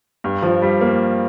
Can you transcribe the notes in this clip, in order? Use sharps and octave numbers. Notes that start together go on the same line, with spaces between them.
G2
F3
G3
A#3